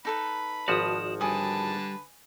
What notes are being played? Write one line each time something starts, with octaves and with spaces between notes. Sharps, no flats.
D#4 A4 B4 B5
G#1 F3 F#4 D5 A5 D#6
D3 G3 B4 G#5 A5 D#6